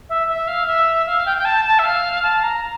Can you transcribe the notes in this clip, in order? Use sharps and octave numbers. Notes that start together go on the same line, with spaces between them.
E5
E5
F5
E5
F5
G5
G5
A5
A5
E5
F5
A5
A#5